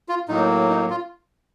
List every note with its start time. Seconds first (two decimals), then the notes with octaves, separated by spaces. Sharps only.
0.09 F4
0.29 A2 F#3 A#3 D#4
0.70 D#4
0.90 F4